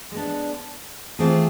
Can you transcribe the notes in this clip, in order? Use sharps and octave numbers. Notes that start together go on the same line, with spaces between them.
G#3 B3 D4
E3 A3 C4 F4 G#4